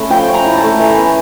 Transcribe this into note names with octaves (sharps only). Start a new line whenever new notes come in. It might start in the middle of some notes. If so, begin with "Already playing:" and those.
Already playing: A3 C#4 B5
F3 G5
C#4
A#5
E4
A5
A3
E3 A#5
B3